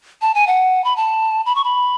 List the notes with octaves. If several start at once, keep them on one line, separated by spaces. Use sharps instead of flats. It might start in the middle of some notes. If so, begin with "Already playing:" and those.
A5
G#5
F#5
B5
A5
B5
C#6
B5